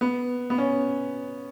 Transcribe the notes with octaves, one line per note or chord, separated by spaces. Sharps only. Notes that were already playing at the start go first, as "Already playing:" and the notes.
B3
B3
C#4